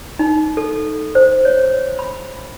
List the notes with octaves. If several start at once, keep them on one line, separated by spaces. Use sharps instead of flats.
D#4
A4
C5
C#5
B5